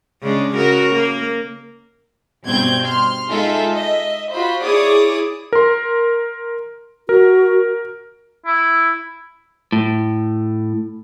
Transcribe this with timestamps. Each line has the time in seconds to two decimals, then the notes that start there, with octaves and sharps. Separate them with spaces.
0.22 C#3 G#3 D4
0.54 C#3 F#4 A#4
0.94 A#3
2.44 G2 B2 C4 G6 G#6
2.87 C6 F6
3.28 G#3 D#4 F4 G#4 A4 E5
3.75 D#5 E5
4.31 F4 F#4 C5 B5
4.63 E4 G#4 C#5 D5 D6 D#6
5.53 A#4 C6
7.09 F#4 A#4
8.46 E4
9.72 A2